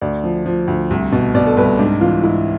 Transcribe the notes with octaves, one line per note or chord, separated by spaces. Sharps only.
D2 D5
F3
F3
D2
C2
B2
B2 D5
A4
C2 B4
G#2 D4
E3 F4
G#2 E4